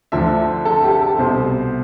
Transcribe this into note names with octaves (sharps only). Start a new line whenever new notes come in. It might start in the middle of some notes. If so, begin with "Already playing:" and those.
D2 D3 F3 E5
A4
G4
A4
C2 B2 C5